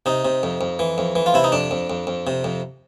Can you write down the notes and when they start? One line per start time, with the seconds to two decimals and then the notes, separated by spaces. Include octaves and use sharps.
0.06 C3 D#4
0.25 C3
0.43 F2
0.61 F2
0.79 E3
0.98 F2
1.15 E3
1.26 F4
1.34 C3 E4
1.44 D#4
1.52 F2 D4
1.71 F2
1.90 F2
2.07 F2
2.27 C3
2.44 F2